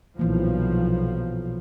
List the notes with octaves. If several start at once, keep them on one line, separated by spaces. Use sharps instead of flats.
B1 A#2 E3 F3 A#3